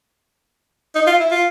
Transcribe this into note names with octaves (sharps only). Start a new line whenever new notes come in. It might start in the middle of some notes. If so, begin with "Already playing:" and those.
D#4
F4
E4
F4